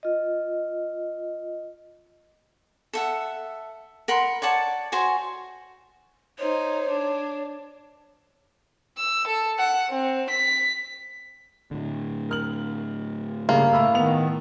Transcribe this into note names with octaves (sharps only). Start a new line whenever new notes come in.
F4 D#5
A4 E5 F#5
A#4 F#5 B5 C6
C#5 D5 F#5 A5
F#4 C5 C#5 G#5
D#4 C5 C#5
D4
E6
A4
F#5
C4
B6
A2 D3
A#4 F6 F#7
G2 C#3 A#3
A2 A3 A#5 B5 E6
D#3 B3 F7